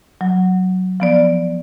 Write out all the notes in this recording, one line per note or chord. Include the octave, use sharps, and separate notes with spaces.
F#3
F3 B3 D5